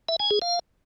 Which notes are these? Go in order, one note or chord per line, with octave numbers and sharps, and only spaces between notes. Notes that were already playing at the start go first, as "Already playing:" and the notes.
E5
G#5
G#4
F5